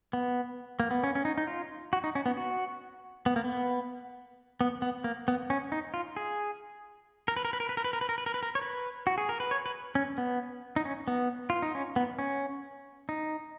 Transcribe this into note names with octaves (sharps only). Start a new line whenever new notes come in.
B3
A#3
B3
C#4
C#4
D#4
D#4
F4
F#4
D#4
C#4
B3
F#4
B3
A#3
B3
B3
B3
A#3
B3
C#4
D#4
F4
G#4
A#4
B4
A#4
B4
A#4
B4
A#4
B4
A#4
B4
A#4
B4
A#4
B4
A#4
C#5
B4
F#4
G#4
A#4
B4
C#5
B4
C#4
B3
D#4
C#4
B3
F4
D#4
C#4
B3
C#4
D#4